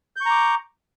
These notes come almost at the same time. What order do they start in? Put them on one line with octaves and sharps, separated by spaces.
G6 C#6 A#5 D6